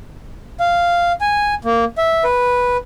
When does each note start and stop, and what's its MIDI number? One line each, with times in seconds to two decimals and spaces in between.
0.60 1.12 77
1.21 1.54 80
1.65 1.85 58
1.98 2.24 76
2.24 2.77 71